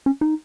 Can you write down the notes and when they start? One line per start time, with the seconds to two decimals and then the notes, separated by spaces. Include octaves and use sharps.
0.06 C#4
0.21 D#4